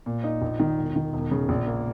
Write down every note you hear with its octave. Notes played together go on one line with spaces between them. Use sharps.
A#2
D#4
A#1
D#3
E1
D#3
E1
C#3
A#1
A#3